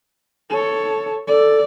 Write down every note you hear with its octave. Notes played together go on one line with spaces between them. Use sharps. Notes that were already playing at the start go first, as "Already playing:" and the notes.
A4 C#5
A4 D5